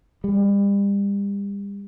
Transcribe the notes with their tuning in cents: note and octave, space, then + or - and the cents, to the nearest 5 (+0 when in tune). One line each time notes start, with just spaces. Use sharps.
G3 +35